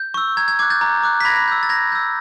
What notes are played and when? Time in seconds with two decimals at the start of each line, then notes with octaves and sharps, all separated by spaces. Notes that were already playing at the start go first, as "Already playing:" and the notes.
Already playing: G6
0.14 C#6 E6
0.37 A#5 G#6
0.48 G#6
0.59 D6 F#6 G#6
0.70 G6 A6
0.81 A#5
1.03 D6 F#6
1.21 B6
1.25 B5 G#6 A#6
1.48 E6 G6
1.63 A6
1.69 B5 G#6 A#6
1.92 E6 G6